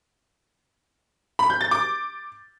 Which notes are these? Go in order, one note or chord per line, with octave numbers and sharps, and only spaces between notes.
B5
G6
A6
D6